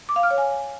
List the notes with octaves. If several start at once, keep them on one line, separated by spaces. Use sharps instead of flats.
D6
F5
F6
C#5
G#5